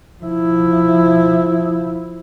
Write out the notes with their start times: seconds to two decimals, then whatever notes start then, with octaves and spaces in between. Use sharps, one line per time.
0.23 F3 E4